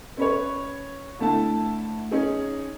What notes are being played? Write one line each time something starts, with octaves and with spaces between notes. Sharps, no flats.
C#4 B4 C#5
D3 A3 E4 A5
C#4 D#4 G#4